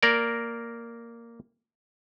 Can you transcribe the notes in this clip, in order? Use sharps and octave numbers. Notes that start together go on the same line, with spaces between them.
A#3 A#4 D5